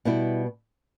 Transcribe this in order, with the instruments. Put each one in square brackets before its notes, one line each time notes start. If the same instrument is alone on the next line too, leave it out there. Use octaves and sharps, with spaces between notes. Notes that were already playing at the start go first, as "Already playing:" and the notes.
[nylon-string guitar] B2 G3 B3 E4